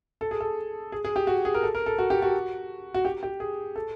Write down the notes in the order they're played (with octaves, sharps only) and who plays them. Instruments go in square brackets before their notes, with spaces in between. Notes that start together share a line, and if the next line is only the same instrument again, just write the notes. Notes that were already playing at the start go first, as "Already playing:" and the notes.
[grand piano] A4
G#4
A4
G#4
G#4
G4
F#4
G#4
A#4
A4
A#4
A4
F#4
G4
F#4
F#4
G4
G4
G#4
A4